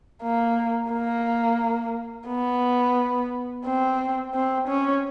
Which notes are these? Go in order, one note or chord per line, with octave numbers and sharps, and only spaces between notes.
A#3
A#3
B3
C4
C4
C#4